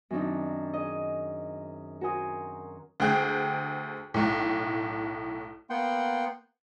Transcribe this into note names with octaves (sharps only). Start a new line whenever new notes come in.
F#2 D#3 C4 D4 D#4
G#4 D#5
F#4 A#4 C5 G#5 C6 D#6
D2 G#4 G5 F#6
B1 A2
A#3 B3 F#5 G5 C6